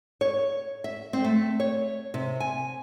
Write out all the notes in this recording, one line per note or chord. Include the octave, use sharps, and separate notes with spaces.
C#5
E5
C4
A3
C#5
C3
G#5